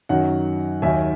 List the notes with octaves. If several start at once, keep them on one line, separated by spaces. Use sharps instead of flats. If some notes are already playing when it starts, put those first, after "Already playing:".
F#2 D#3 F#3 F#5
D#2 D#3 F#3 E5 G#5